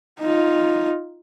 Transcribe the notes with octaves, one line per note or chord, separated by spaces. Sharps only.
D#4 F4